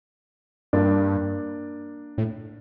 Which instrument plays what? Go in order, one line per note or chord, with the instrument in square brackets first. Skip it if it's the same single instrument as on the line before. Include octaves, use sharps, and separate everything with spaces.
[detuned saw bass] G2 [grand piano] A#3 D4
[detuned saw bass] A2